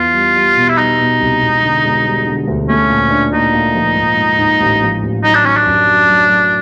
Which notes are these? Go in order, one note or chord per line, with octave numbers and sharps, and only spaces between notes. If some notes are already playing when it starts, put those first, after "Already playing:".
Already playing: E2 F4
G3
G3
B2
E4
G3 D#4
B2
C2
E1
D3
E1
G3
D3
D2
A3 C#4
A#2
D4
A#2 D#4
A#2
F3
G#2
G#2
G#2
A1
F3
A1
F#3 D#4
D4
D#3 C#4
D4
F#2
F#3
F#3
F#3